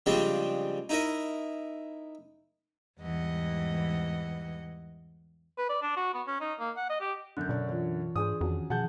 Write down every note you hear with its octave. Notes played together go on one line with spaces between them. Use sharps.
C#3 F3 G3 G#3 C4 D4
D#4 E4 A#4 D#5
E2 G#2 E3 G3 D#5 F#5
B4
D5
D4
F#4
B3
C#4
D#4
A#3
F#5
D#5
G4
F#2 D3 F#6 G6
B2 D4 C#5 D5
E3 F4 C#5
G#2 D4 G#4 C5 D#6
F2 D#3 F#3 C#4 A5
B2 F3 G#4 F#5 A5 G6